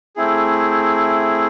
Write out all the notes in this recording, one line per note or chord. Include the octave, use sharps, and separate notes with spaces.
A3 C4 E4 G#4